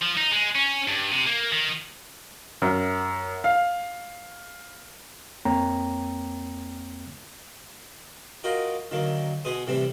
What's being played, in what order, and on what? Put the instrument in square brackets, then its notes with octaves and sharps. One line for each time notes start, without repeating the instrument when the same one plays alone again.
[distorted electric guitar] F3
D#4
G#3
C#4
G2
C3
A#3
D#3
[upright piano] F#2
F5
[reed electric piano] F2 A#3 C4 C#5 G5 A#5
[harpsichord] F4 F#4 A#4 D#5 G5
D3 D#3 F#3 A#3
B2 B3 G#4 C6 D#6
A2 C3 E3 G3 C4